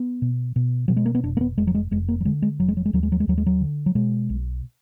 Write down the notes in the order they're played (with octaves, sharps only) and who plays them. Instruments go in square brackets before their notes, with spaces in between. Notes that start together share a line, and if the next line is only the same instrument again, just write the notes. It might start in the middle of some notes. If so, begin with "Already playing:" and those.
Already playing: [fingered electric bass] B3
B2
B2
B2 F#3
G#3
A#3
B3
F1 D4
A#3
B3
F1 G#3
F#3
G#3
F1 G#3
A#3
F#3
D3 G#3
G#3
F1 F#3
G#3
F#3
G#3
D#2 F#3
G#3
F#3
G#3
D#2 F#3
G#3
F#3
D3
F#3
B2 G#3
B1